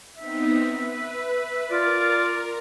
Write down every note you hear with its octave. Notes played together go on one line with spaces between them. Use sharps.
B3 C4 D#4 E5
B4
F4 A#4 D5